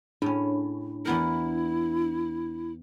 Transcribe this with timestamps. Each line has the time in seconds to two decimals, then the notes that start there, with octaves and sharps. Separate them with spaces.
0.22 A2 C#4 D4
1.05 E2 B3 E4 A#4